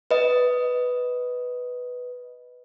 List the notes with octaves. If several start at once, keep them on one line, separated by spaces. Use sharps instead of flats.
B4 D#5